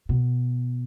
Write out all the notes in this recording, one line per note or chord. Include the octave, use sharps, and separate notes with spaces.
B2